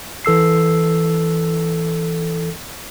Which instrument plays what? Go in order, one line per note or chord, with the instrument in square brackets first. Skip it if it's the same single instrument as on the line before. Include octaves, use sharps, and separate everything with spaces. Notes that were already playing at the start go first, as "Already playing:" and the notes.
[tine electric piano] E3 A4 E6 C7